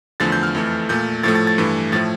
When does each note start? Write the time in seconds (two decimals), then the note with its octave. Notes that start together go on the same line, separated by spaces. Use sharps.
0.20 E2 D3 F3 A3 A6
0.32 G6
0.43 F6
0.55 F2 E3 A3
0.89 A#2 A3 G6
1.23 A2 F3 A3 A6
1.35 A6
1.47 A6
1.58 G2 E3 A3
1.92 A2 F3 A3 A6